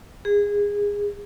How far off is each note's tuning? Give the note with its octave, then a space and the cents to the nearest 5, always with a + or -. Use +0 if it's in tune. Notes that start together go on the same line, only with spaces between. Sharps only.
G#4 -20